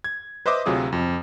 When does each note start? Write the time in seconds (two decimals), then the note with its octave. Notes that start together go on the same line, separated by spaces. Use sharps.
0.04 G#6
0.46 B4 C5 D#5 E5 D6 D#6
0.66 D2 C3 F#3 F4 G#4 D#6
0.92 F2